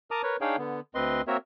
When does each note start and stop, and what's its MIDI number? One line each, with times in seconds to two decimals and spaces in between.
0.11 0.22 70
0.11 0.22 81
0.11 0.22 82
0.11 0.22 86
0.11 0.22 87
0.23 0.37 70
0.23 0.37 71
0.23 0.37 73
0.41 0.56 62
0.41 0.56 63
0.41 0.56 68
0.41 0.56 73
0.41 0.56 77
0.41 0.56 79
0.58 0.80 50
0.58 0.80 59
0.95 1.22 38
0.95 1.22 60
0.95 1.22 71
0.95 1.22 75
0.95 1.22 84
1.28 1.37 58
1.28 1.37 60
1.28 1.37 66
1.28 1.37 70
1.28 1.37 73
1.28 1.37 76